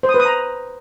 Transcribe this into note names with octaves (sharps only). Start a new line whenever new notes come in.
C5
D#6
B4
D#6
A#5